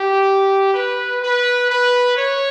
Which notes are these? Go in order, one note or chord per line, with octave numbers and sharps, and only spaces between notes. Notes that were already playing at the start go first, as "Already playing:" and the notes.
Already playing: G4
B4
B4
B4
C#5